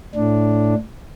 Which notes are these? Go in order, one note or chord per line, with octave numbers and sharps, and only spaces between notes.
A2 D4